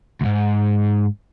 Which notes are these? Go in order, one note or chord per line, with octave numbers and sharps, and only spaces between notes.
D2 G#2